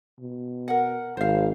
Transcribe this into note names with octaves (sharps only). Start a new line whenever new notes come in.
B2
A#4 F#5
G#1 C5 F5